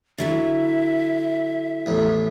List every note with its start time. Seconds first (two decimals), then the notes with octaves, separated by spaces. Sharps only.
0.18 D3 F#3 E4 E5
1.86 A1 E2 A2